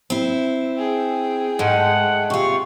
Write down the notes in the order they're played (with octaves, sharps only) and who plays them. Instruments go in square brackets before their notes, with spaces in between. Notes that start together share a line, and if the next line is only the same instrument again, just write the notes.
[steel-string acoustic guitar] C4 E4
[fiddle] G#4 G5
[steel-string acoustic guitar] G#2 [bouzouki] G#3 A3 D#4 [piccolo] F#5
[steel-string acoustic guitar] C3 F4 [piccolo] C#6